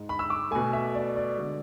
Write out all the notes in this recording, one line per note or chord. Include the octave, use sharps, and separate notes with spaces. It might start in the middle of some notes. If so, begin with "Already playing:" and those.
Already playing: G#2 G#3
B5
E6
D6
B2 A3 G#5
E5
D5
D5
D3 G#3